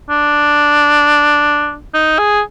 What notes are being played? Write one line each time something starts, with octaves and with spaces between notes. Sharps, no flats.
D4
D#4
G#4